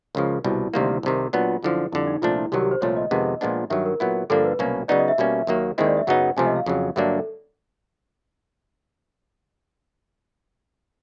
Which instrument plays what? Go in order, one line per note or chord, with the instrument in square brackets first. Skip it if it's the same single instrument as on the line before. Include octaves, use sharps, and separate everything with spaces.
[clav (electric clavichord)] C#2 C#3 F3 [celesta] A#4
[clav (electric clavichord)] C2 B2 G3 [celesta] E4
[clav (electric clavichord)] D2 C3 D#3 G3 A#3
C2 C3 D#3
[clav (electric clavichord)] A#2 F#3 B3 D4 [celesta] F4
[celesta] F4
[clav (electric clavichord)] F#2 D3 F3 [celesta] E4
[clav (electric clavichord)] F2 D3 G3 [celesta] E4
[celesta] D#4
[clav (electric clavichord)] C2 A#2 F3 A3 D4 [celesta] F4
[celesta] E4
[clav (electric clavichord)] C2 C3 D#3 F#3 [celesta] G4
[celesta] G4
C5
[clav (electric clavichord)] C2 A#2 F3 A3 [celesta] C#5
[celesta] D#5
[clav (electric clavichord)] F2 C3 D#3 G#3 B3
A#2 F3 G#3 B3 D4
[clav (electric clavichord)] G2 D#3 F#3 [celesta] E5
[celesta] A#4
[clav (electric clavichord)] A#2 F#3 B3 E4
[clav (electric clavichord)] G2 D3 F3 A#3 D4 [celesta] A4
[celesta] B4
[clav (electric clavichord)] C2 B2 F#3 A#3 C#4
[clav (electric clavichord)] C#3 F#3 B3 D#4 [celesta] D5
[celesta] D#5
E5
[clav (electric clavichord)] B2 G3 A#3 C#4
D#2 D#3 F#3 A#3
[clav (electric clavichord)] D#2 D#3 G#3 C4 E4 [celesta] D#5
[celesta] D5
E5
[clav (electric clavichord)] F#2 C#3 F#3 B3 D#4 [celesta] F#5
[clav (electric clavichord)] C#2 C3 F3 A3 [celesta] G#5
[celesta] D#5
F5
[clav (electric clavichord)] F2 C#3 F#3
[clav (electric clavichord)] G2 D3 F#3 A#3 D4 [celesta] E5
[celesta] A4